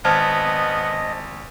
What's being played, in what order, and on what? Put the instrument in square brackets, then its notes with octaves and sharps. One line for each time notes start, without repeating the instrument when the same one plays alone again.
[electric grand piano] G#1 F6 [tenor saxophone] B3 [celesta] C5 A5 G#6 [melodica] D#5